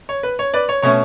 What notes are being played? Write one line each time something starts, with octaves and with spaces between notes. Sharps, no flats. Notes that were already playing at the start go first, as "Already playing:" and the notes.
C#5
B4
C#5
B4 D5
C#5
B2 A3 C#4 C#5